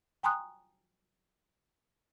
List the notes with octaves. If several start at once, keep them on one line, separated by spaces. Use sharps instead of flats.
G5 G#5 A#5 C6 D#6 F#6